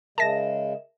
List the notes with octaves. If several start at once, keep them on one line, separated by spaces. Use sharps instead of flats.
C#3 G#3 A#4 E5 A5 A#6 E7